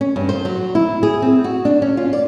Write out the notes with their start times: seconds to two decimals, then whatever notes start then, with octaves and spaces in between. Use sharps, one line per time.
0.01 C#4
0.16 G2
0.29 C5
0.45 F#3
0.75 E4
1.03 G#4
1.22 C4
1.44 F#4
1.65 D4
1.82 C#4
1.97 F4
2.13 D5